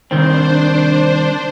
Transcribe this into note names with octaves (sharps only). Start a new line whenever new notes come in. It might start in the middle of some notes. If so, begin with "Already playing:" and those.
C2 D#3 C4 D4 C5